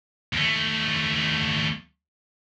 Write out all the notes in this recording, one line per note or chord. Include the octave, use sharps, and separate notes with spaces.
D#2 A3